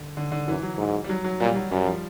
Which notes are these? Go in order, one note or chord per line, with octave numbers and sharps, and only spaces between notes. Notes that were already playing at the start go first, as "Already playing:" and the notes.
Already playing: D3
D3
D3
F#2 E3
F#3
G#2
G3
F#3
F#3
A#2 G3
F#3
F#2 G3
F3